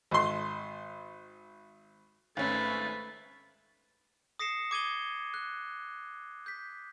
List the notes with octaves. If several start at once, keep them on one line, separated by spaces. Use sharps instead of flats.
G#1 C6
G#1 A3 C#4 B4 E5 A6
D#6 A#6 C7 C#7 E7
D6 G#6 D#7 G7
F#6
G6 B6